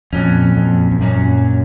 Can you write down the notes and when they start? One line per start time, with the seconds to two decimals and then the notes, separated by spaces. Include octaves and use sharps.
0.13 F2 A#2 F#3 C#4
0.57 F2
0.91 F2
1.01 F#2 A#2 F#3 C#4